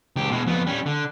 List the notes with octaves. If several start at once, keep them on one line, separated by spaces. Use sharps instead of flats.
C#2 G4
B2 G#3
F2 B3
G3 C#4
D3